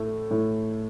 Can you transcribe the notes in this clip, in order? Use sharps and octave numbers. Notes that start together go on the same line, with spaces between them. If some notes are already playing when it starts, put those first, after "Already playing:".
Already playing: A2 A3
A2